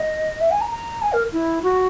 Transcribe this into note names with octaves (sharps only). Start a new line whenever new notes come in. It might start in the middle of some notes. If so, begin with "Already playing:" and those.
Already playing: D#5
E5
G#5
A#5
A#5
G#5
A#4
E4
F#4